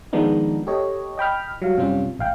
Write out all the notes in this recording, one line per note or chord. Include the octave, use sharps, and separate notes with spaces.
D#3 F3 G#3 B3 D4 D#4
G4 A4 C#5 D#5
D#5 G5 B5 F6
F#3 G3 F5
F#2 C3 G3 C4 C#4 F4
A1 F5 G5